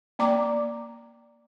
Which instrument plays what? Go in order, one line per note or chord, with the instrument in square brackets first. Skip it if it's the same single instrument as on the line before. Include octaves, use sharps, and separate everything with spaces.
[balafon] A#3 D5 A#5 D6